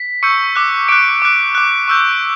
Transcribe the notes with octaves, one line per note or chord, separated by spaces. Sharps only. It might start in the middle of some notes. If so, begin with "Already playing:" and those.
Already playing: B6
C#6 E6 G6 C#7
D6 F#6
D6 F#6 D7
D6 F#6
D6 F#6
C#6 E6 G6